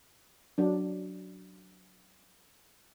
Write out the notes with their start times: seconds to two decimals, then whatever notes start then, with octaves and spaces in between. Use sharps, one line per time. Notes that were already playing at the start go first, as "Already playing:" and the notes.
0.58 F#3 D4